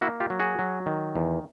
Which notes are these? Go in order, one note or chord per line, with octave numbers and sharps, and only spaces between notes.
A#3 E4 F#4
F4 G4
F#3
F#4 G#4
F#3
D#3
E2